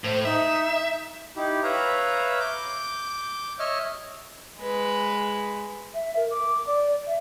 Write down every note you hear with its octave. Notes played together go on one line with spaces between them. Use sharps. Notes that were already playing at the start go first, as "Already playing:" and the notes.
A2 C5
D#4 E5
D#4 E4 G4
B4 C#5 E5 F5 A#5
D6 G6
C#5 D#5 E5 F6
G#3 B4
E5
A#4
D6
D5
E5